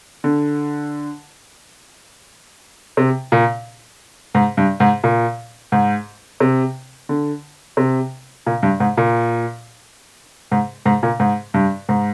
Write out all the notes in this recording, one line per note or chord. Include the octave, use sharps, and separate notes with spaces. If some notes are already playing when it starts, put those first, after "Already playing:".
D3
C3
A#2
G#2
G2
G#2
A#2
G#2
C3
D3
C3
A#2
G2
G#2
A#2
G#2
G#2
A#2
G#2
G2
G#2